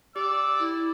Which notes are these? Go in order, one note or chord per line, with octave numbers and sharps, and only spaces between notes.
G4 D5 E6
E4